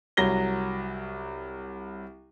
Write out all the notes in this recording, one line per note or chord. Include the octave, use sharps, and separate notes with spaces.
C2 F#3 A#6 G7